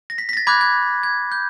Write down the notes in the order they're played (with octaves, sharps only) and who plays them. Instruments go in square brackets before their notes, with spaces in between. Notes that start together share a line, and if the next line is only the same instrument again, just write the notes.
[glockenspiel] A#6
B6
B6
A#6
A6
B5 D6 F#6 G#6
G#6
G#6
G6